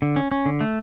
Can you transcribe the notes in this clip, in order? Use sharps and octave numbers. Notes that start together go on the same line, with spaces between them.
D3
C#4
C#4
D3
A3